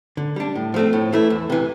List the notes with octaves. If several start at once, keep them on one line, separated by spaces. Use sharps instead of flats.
D3
G3 D4
A2
F3 A3 C4
A2
E3 A3 E4
E2
C3 E3